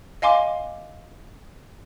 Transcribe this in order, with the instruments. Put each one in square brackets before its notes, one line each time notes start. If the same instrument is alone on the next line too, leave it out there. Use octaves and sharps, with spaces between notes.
[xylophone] D#5 F5 G#5 C6 D6